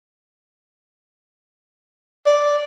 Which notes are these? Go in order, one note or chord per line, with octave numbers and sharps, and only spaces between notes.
D5